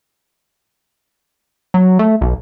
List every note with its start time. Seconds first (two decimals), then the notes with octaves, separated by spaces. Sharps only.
1.74 F#3
1.99 A3
2.21 B1